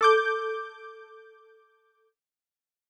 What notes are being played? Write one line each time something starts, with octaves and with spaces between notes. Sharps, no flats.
A4 D6 G6